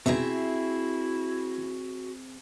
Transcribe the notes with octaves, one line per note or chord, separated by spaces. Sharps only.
B2 C4 D#4 E4 F#4 G#4 E5